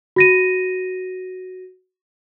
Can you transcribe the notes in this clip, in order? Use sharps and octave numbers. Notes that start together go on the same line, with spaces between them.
F#4 A#6 D#7